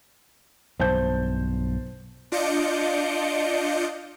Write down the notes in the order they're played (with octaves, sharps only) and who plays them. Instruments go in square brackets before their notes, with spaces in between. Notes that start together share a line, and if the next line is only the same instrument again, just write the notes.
[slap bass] B1 G2 [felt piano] C5 A5 G6
[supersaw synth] D4 F4 D#5 D6 G6 C#7